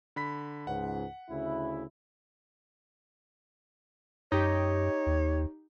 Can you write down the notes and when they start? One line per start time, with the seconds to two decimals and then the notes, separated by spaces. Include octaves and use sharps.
0.16 D3 B5 B6
0.67 C#2 G#2 F#5
1.29 D2 C#3 E4
4.32 F#2 D#4 G4 C#5
5.06 D#2